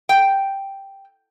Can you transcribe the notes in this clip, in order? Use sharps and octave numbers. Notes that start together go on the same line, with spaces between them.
G5